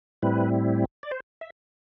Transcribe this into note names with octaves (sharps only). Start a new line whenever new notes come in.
A2 G3 C4 E4 B4
D5
C5
E5